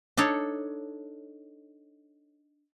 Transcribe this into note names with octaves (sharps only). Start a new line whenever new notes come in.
D4 D#4 A4 C#5